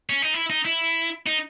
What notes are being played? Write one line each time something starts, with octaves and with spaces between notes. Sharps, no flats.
C#4
D#4
E4
D#4
E4
D#4